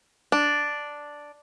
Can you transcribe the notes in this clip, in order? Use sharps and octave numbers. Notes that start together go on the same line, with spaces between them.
D4